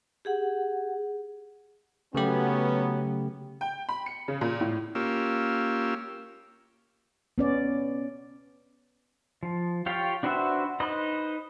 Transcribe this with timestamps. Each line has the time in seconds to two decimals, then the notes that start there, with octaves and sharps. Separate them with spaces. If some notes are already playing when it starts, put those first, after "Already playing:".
0.25 G4 G#4 F#5
2.15 C#3 F#3 A3 B3 C#4 G4
3.61 G5
3.89 B5
4.06 C#7
4.28 C#3
4.41 A#2
4.60 A2
4.95 A#3 C#4 F4 G4 E6
7.38 B3 C#4 D5
9.43 F3
9.86 F4 G4 C#5 F5 G5
10.23 D4 F#4 B4 C5 E5
10.80 D#4 B4 C5 D#5